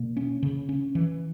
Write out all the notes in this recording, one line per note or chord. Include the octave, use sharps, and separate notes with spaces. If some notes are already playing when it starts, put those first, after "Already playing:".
Already playing: B2 A#3
C#4
C#3
C#4
E3